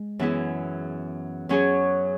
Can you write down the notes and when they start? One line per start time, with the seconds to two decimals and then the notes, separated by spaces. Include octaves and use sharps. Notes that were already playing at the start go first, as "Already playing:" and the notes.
Already playing: G#3
0.19 F#2 E3 B3 E4 G#4
1.49 F#2 F#3 C#4 G#4 C#5